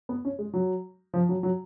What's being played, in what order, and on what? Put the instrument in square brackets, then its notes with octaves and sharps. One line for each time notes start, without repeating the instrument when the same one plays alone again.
[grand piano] B3
C#4
G#3
F#3
F3
F#3
F#3